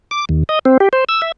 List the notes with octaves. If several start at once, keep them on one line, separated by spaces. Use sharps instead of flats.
D6
D#2
D#5
C4
G4
C5
E6
E5